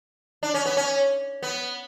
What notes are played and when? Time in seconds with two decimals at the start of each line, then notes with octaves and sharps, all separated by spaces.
0.43 D4
0.54 C#4
0.65 B3
0.77 C#4
1.43 B3